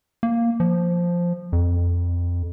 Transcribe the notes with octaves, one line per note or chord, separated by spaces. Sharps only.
A#3
F3
F2